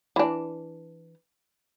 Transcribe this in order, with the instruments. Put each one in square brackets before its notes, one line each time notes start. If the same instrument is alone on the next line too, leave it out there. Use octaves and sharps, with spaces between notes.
[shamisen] E3 D4